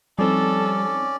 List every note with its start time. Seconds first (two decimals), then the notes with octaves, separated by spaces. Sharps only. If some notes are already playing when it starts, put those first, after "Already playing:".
0.19 F3 G3 C4 C#4 D#4 A4 D5